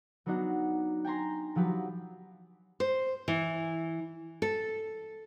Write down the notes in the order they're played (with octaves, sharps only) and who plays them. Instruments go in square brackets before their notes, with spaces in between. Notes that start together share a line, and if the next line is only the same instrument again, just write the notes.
[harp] F#3 B3 D4 D#4 F#4
G5 G#5 A#5 C6
F3 F#3 G4 B4
[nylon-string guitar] C5
E3
A4